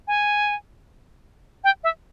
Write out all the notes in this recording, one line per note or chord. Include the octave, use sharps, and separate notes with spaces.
G#5
G5
E5